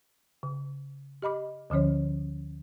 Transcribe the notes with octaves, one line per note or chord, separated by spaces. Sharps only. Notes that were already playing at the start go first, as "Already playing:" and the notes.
C#3
G4 D#5 B5 D6
D2 D3 F3 C#4 C#5